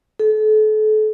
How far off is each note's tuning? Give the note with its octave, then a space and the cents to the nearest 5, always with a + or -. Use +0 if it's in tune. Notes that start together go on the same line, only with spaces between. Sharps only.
A4 -35